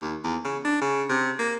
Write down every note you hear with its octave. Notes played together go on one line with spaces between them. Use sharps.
D#2
E2
C#3
D4
C#3
C3
A#3